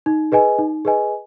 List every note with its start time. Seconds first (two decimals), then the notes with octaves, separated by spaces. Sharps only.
0.06 D#4
0.32 G#4 B4 D#5 G#5
0.59 D#4
0.85 G#4 B4 D#5 G#5